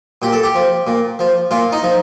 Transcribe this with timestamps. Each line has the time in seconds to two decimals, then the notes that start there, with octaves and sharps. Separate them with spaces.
0.22 A#2 G4
0.33 A4
0.43 G4
0.55 F3
0.87 A#2
1.19 F3
1.51 A#2 F4
1.72 D#4
1.83 F3